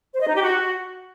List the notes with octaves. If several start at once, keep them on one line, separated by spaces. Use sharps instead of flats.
C5
D#5
D#4
G4
F#4